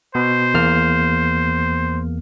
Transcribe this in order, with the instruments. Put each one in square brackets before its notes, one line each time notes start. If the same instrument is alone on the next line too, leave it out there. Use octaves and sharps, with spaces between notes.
[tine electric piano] B2 [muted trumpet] C5
[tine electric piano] E2 A#3 F6